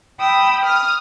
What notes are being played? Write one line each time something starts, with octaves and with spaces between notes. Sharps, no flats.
G5 B5 D#6 E6
D#6 F6